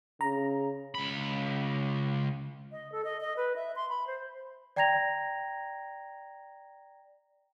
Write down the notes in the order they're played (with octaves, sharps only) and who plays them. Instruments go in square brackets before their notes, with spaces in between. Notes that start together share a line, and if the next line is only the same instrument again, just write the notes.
[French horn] C#3 [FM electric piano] A#5
[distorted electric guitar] C#2 B5
[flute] D#5
A4
D#5
D#5
B4
E5
C6
B5
C5
[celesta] D5 G5 A#5 G#6 A#6 F7